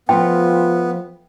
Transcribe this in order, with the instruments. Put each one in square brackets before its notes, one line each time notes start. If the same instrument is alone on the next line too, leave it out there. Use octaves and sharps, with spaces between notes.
[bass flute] F3 [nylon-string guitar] A3 C4 F4 [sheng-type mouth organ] B3 [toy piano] G5